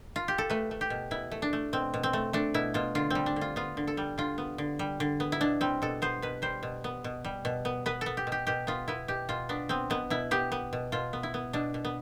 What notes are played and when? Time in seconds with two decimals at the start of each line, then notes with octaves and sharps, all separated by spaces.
0.16 F4
0.28 G4
0.38 A4
0.50 A3 B4
0.71 A3
0.81 G4
0.90 B2
1.11 B2 E4
1.32 A3
1.42 D4
1.53 A3
1.73 B2 C4
1.94 B2
2.03 C4
2.13 A3
2.33 A3 D4
2.54 B2 E4
2.74 B2 F4
2.95 D3 F4
3.10 G3 C4
3.26 D4
3.36 D3
3.41 F4
3.56 B3 F4
3.77 D3
3.87 A4
3.97 G3
4.18 D3 F4
4.38 B3
4.58 D3
4.79 G3
5.00 D3
5.20 B3
5.32 E4
5.41 B2 D4
5.61 G3 C4
5.82 B2 A4
6.02 B3 C5
6.22 B2 B4
6.42 G3 C5
6.63 B2
6.84 B3
7.04 B2
7.25 G3
7.45 B2
7.65 B3
7.86 B3 B4
8.01 B3 A4
8.17 G4
8.27 B2
8.32 G4
8.47 B2 G4
8.67 B3 F4
8.88 B3 E4
9.08 B2 G4
9.29 B2 F4
9.49 B3 D4
9.69 B3 C4
9.90 B2 B3
10.10 B2 E4
10.31 B3 G4
10.52 B3
10.73 B2
10.92 B2 F4
11.13 B3
11.23 E4
11.34 B3
11.53 B2 D4
11.74 B2
11.85 B3